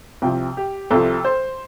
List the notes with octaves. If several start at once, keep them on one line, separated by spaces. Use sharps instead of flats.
C2 C3 F3 G5
G4
C2 C3 F3 A4
C5